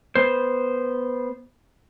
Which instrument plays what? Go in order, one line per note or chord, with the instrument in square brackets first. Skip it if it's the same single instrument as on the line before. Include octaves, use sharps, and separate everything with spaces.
[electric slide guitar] B3 C5